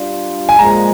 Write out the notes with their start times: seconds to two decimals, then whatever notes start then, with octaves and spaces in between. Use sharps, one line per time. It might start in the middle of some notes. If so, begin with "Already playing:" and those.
Already playing: G3 D4 F4
0.49 G#5
0.59 A#2 F3 G#3 A#5